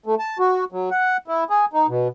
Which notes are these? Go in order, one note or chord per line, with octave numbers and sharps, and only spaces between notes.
A3
A5
F#4
F#3
F#5
E4
G#4
D#4
B2